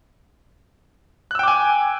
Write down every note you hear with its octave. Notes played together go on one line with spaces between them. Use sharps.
G5 G#5 D6 E6 F#6